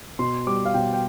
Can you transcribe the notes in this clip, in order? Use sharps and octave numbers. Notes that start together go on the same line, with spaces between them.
B2 C6
G3 D6
F5
B2 G5
G5